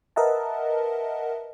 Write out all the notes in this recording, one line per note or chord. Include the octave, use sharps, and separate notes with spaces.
A#4 B4 D#5 E5 F#5 A5